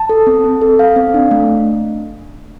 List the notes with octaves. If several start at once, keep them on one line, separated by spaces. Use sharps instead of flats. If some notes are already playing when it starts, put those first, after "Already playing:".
Already playing: A5
A4
C4
C4
A4
F5
C4
D4
A3